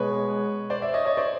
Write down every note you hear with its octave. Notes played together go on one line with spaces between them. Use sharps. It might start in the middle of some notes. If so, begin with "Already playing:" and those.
Already playing: B2 G#3 B3 B4 C#5
C5 D5
D5 E5
C#5 D#5
C#5 D#5
C5 D5